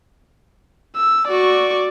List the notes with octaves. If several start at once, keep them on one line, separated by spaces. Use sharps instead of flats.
E6
F#4 D5 C#6